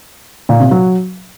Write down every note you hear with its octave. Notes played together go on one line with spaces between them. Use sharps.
A#2
C3
F#3